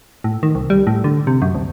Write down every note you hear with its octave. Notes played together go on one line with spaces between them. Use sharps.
A2
D#3
C2
G3
A2
D3
C3
F#2
D2